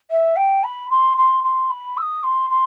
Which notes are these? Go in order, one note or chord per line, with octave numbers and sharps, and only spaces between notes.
E5
G5
B5
C6
C6
C6
B5
E6
D#6
C6
C6